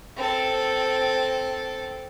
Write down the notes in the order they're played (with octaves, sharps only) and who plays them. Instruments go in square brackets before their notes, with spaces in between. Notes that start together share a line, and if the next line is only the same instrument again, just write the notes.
[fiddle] C4 A4